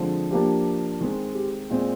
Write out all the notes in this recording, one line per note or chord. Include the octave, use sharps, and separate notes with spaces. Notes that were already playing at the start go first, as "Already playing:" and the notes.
Already playing: D3 F3 G#3 C4
F3 A#3 D4 G4
D#3 G#3 C4
G4
A#2 G#3 C4